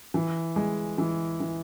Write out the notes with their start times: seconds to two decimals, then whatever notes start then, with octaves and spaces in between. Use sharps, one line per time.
0.14 E3
0.56 G#3
0.98 E3
1.40 E3